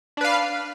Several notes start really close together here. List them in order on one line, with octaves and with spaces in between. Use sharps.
D4 B4 F5